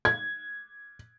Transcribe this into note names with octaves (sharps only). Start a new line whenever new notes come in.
G#6